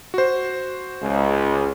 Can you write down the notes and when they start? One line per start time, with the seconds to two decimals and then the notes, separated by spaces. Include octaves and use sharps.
0.14 F#4 C5
1.01 C#2